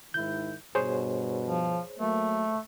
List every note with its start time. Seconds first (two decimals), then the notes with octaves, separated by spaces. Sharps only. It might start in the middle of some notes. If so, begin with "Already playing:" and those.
0.14 G#2 D#3 E4 G6
0.75 G2 B2 G#4 C5 C#5
1.46 F3
1.99 F#3 A3 A#3